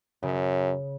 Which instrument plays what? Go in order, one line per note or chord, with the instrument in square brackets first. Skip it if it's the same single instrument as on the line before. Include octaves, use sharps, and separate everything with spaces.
[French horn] F#2 [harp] C#3